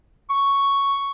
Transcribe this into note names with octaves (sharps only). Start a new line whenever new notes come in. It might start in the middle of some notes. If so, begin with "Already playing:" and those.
C#6